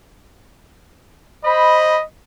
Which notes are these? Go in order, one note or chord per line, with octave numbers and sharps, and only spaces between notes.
C5 D#5 B5